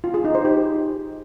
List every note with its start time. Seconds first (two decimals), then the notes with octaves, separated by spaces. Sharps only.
0.04 F4
0.14 G#4
0.24 D#4
0.35 C5
0.45 G4